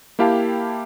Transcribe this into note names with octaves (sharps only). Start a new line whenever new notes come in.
A#3 E4 G4 F5 G5 A5